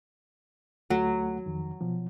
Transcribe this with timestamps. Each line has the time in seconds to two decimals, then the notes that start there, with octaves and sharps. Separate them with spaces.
0.90 D2 F#3 A3 F#5
1.46 F2 D#3
1.81 B2 F3